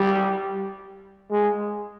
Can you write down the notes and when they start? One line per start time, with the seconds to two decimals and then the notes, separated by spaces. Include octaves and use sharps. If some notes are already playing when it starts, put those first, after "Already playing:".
Already playing: G3
1.31 G#3